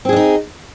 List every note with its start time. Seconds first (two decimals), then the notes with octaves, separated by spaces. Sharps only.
0.05 C4
0.09 G#4
0.13 D4
0.16 D#4